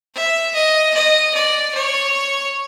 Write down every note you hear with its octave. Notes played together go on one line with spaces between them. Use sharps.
E5
D#5
D#5
D5
C#5